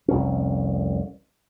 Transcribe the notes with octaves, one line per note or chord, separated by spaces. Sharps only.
F1 C2 C#4